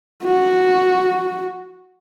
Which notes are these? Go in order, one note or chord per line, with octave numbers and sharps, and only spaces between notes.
F#4